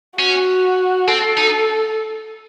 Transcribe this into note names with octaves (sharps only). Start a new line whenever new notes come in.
C#4 F#4
C4 A4
D#4